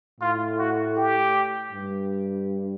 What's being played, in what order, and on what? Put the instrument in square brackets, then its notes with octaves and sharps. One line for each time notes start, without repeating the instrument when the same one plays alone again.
[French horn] A2 [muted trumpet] F4
[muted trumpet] F#4
G4
[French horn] G2